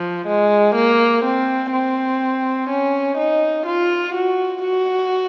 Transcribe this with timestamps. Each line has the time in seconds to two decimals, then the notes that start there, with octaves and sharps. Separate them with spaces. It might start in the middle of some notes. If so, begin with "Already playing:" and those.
Already playing: F3
0.27 G#3
0.75 A#3
1.25 C4
1.73 C4
2.70 C#4
3.18 D#4
3.67 F4
4.15 F#4
4.63 F#4